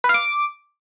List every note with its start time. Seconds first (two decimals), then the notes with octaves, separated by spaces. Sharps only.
0.04 B4
0.09 F5
0.14 D6